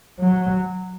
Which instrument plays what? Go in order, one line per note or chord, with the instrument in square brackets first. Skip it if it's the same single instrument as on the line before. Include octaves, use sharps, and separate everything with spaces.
[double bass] F#3